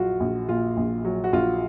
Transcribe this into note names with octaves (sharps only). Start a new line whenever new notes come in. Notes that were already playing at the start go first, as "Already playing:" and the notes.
Already playing: A#1 F#3 F4 F#4
A#1
A#2 F4
A#1
F#3
F#4
A#1 F4